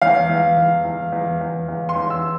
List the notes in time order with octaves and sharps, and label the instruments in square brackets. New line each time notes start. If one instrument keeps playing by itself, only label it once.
[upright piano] E2 F5
E2
E2
E2
E2
E2
E2
C6
E2
E6